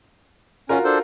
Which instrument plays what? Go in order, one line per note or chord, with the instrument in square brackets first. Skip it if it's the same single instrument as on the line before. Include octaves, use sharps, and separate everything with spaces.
[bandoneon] C#4 [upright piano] F4 F#4 A#4
[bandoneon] D4 A4 C5